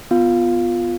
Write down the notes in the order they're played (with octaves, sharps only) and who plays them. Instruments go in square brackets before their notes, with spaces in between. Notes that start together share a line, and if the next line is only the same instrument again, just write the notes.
[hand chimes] B3 F4 F5